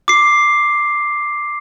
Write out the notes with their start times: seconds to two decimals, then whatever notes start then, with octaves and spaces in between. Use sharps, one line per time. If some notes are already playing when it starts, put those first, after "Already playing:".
0.08 D6 C7